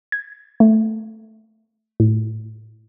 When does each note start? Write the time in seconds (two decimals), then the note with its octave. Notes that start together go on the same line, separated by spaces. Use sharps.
0.12 G#6
0.60 A3
2.00 A2